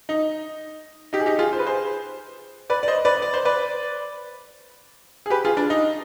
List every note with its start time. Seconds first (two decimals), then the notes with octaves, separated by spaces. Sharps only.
0.09 D#4
1.13 D#4 G4
1.20 G#4
1.26 D#4 G4
1.39 F4 G#4
1.53 C5
1.59 B4
1.67 G#4 C5
2.70 B4 D5
2.83 D5
2.88 C5 D#5
3.05 B4 D5
3.22 D5
3.34 C5
3.45 B4 D5
5.26 G#4
5.30 G4 B4
5.45 F4 G#4
5.57 D4
5.70 D#4